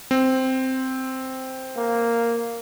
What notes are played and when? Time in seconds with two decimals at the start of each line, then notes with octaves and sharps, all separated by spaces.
0.11 C4
1.77 A#3